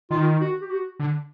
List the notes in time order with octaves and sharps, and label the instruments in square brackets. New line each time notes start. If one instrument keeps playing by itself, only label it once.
[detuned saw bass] D#3 [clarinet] F4
[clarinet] F#4
G4
F#4
[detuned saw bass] D3